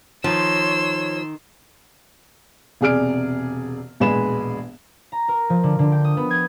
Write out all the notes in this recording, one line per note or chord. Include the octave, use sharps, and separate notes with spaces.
D#3 F3 C#5 C6 E6
E1 C3 G#4 D5 F6 D7
E1 A#1 G#3 G#4 B4 E7
A#5
A#4
F3
D3
D3
G5
D#6
B3
G#6